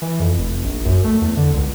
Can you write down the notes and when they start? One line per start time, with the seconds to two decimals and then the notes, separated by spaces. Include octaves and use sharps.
0.02 E3
0.20 F2
0.38 F1
0.65 A#1
0.86 F#2
1.05 A3
1.22 E2
1.37 D3
1.54 C#2